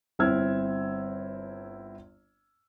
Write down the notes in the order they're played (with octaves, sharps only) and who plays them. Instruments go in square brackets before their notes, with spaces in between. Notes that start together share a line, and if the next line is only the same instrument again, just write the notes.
[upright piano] G1 C4 E4 E6 F6 G#6